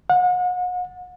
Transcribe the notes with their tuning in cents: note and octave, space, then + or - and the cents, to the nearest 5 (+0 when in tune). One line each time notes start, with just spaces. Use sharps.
F#5 -40